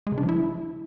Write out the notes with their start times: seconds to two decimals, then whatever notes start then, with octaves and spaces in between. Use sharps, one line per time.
0.07 G#3
0.12 C#3
0.18 D4
0.23 F3
0.29 E4